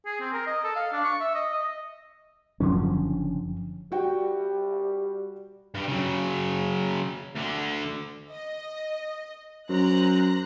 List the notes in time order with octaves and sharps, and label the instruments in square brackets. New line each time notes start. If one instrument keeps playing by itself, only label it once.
[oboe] G#4
C4
A#4
D#5
A4
F5
D4
C#6
E5
D#5
D#5
[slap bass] F#1 D3 C#4 [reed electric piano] F#2 F3
[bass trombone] G3 [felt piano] F#4 G5
[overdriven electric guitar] G2 G3
C#3 F#3
D2 D3
[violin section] D#5
[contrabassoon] F#2 [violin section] C5 A#5 F#6